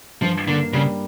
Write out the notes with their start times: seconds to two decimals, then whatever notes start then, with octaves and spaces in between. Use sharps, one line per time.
0.22 G2 F3
0.48 D3 A#3
0.73 C#3 G3